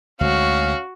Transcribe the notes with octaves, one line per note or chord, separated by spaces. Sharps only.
D2 G#3 C#4 F#4 F5